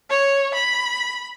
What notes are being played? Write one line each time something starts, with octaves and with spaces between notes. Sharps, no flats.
C#5
B5